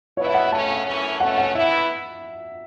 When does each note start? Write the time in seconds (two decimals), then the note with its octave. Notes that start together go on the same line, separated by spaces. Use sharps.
0.17 B2 B3 E4 C#5
0.26 E5
0.34 F#5
0.52 C#3 A3 C#4 A5
0.86 F#2 E3 A3 C#4
1.20 B2 A3 C#4 F#5
1.38 F#5
1.55 E3 B3 E4 E5